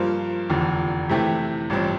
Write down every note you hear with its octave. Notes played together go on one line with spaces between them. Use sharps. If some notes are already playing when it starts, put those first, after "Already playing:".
Already playing: G2 F3 A#3 F4 C5
F1 E2 D3 F3
C3 E3 A3 C4 G4
A1 G2 F3 C4